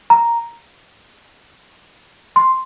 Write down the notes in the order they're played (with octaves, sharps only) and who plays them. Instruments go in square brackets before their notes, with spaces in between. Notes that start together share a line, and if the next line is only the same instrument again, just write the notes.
[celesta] A#5
C6